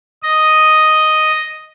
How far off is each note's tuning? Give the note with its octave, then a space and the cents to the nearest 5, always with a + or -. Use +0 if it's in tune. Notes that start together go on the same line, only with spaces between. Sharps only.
D#5 +0